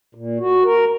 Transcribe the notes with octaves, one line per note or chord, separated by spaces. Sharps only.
A#2
F#4
A#4